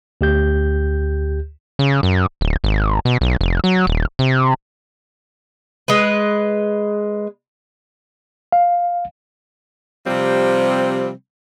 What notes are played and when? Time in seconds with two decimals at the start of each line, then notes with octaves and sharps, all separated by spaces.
0.21 D2 G4 G6
1.79 C#3
2.03 F#2
2.41 D1
2.64 G#1
3.05 B2
3.21 B1
3.41 F1
3.64 F#3
3.87 D#1
4.19 C3
5.88 G#3 B4
8.52 F5
10.07 C3 F3 G3 C4